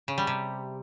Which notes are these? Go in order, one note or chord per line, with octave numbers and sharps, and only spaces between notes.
C#3
G3
C3